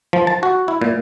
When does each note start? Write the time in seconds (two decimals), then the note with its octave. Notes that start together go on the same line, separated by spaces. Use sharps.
0.13 F3
0.27 A5
0.43 F#4
0.68 E4
0.81 A#2